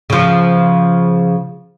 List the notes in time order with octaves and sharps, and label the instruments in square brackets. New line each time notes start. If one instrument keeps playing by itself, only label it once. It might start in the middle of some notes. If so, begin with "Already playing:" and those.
[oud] C#3 F3